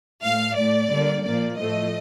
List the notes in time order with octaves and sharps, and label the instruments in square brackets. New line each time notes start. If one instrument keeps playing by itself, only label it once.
[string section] A2 A3 F5
A2 A3 D5
D3 G3 A#3
A#2 F3 A#3 D5
A2 F3 A3 D#5